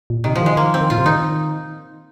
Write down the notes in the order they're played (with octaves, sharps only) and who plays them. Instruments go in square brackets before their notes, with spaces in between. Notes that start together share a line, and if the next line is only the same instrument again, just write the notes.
[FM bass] A#2
[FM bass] C3 [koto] D#3
[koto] F3
[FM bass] D#3 [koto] G#3
[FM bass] D#3 [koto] A#3
[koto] C4
[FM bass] D#3
[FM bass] A#2 [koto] F4
[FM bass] C3
[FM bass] D#3 [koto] D#4